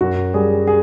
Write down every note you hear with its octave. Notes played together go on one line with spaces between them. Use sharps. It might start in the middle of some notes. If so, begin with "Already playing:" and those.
F#2 F#4
G3 G#4
G#4